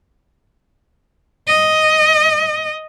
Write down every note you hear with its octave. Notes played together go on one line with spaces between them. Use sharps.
D#5